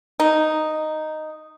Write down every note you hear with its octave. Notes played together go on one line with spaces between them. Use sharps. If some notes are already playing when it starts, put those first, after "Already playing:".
D#4